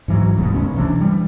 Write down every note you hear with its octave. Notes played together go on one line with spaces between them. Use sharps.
G#2 E3 F#3
D1 C2 G#2 B2
F#1 C#2 C#4
C3 E3 F#3 D4
E3 G3